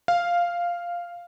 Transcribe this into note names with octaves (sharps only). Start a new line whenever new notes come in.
F5